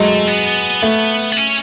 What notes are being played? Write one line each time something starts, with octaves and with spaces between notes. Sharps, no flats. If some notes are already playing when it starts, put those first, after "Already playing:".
Already playing: F#3 G#3 A3
B3
A3
B3
C#4